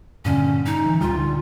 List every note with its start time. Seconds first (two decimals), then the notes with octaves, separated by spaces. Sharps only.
0.25 G2 A#2 D3 C#4
0.66 D#4
0.86 E3
1.01 C#2 A#2 G3 F4
1.15 D3